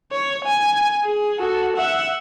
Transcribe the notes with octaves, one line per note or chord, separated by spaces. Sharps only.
C#5
G#5
G#4
F#4 A4
E5 F#5